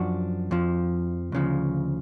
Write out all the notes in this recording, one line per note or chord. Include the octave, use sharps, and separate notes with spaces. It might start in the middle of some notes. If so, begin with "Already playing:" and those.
Already playing: F#2 F3 D4 F#4
F2 F3
D2 C#3 F3